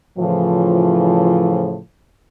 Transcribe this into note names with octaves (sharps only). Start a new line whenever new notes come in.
A2 C#3 E3 F3